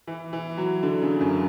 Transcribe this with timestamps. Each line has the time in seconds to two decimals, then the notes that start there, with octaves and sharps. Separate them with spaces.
0.07 E3
0.33 E3
0.58 F#3
0.83 D3
1.02 C#3
1.21 F#2